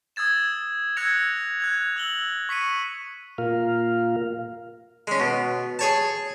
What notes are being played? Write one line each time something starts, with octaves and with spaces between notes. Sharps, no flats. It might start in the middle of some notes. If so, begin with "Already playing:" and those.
D#6 E6 G#6 A6 E7
E6 F#6 G#6 A#6 C#7 F7
F#6 G#6 F7
E6 F#7 G7
C#6 B6 C#7 D#7
A#2 F4 A#4 F5
G#3 C#4
B2
G#4 C#5 A5